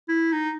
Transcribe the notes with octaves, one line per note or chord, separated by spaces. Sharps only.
E4
D#4